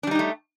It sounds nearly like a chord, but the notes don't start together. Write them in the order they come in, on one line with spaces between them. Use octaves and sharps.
D4 G3 D#4 G4 A3